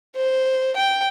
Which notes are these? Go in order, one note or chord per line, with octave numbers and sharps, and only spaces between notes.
C5
G5